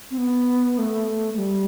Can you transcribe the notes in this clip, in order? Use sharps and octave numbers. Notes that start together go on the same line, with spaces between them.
C4
B3
A3
A3
G3